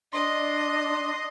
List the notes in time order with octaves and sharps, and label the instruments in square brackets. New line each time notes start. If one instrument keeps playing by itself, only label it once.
[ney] D4 [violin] D#5 [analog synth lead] C6